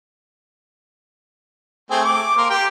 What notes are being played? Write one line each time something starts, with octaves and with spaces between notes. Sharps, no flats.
A3 C4 G#4
D6
A#3 A#4 C6
G4 G5